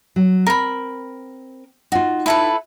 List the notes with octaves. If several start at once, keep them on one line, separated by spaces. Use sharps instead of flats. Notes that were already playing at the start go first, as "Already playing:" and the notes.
F#3
C4 A#4 B5
D#4 F4 F#4
E4 A4 B4